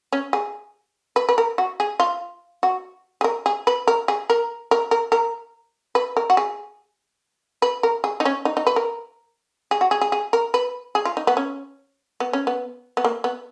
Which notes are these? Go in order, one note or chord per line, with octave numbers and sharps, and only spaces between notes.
C#4
G#4
B4
B4
A#4
F#4
G#4
F4
F#4
G#4
A#4
G#4
B4
A#4
G#4
A#4
A#4
A#4
A#4
B4
A#4
F#4
G#4
B4
A#4
G#4
D#4
C#4
D#4
D#4
B4
A#4
G#4
F#4
G#4
G#4
G#4
A#4
B4
G#4
F4
D#4
B3
C#4
B3
C#4
B3
B3
A#3
B3